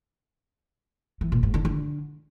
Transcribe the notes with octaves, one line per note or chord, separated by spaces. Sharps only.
E3
A#2
G#2
D3
D3